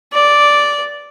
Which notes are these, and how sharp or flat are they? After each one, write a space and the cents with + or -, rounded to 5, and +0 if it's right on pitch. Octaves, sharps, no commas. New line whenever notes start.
D5 -5